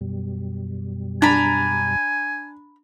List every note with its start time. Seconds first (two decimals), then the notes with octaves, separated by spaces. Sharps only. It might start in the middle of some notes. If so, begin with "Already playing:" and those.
0.01 F#2 B2 G3
1.22 D4 G#5 A#5 B5